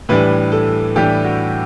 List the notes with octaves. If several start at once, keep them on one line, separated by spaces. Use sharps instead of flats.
A2 E3 G3 D4 B4
A4
A2 E3 G3 D4 G4
F#4